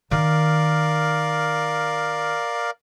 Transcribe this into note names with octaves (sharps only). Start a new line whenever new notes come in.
D#3 A#4 D5 F5